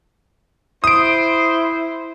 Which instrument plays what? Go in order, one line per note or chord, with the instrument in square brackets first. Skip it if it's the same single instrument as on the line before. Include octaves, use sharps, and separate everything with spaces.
[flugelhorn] E4 [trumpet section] C5 [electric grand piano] D#6 D7